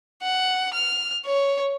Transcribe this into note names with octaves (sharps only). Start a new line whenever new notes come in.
F#5
F6
C#5